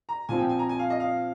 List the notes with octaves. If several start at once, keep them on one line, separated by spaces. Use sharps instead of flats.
A#5
A#2 F3 C4 G#5
G5
G#5
A#5
G#5
F5
D#5
F5